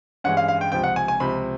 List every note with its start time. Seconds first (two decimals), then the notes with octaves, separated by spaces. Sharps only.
0.24 G2 E3 G#3 C#4 F#5
0.37 F5
0.48 F5
0.61 G5
0.72 C#2 C3 F3 G5
0.84 F#5
0.96 G#5
1.08 G#5
1.20 C#2 C3 F3 B5